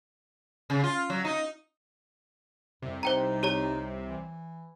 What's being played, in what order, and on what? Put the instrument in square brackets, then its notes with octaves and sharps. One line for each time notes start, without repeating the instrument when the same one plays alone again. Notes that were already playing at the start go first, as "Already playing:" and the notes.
[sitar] C#3
F4
F#3
D#4
[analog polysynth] C2 C3 [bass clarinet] F2
[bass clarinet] D#4 [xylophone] C5 G5 A#5
[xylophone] G4 C#5 A#5
[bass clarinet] E3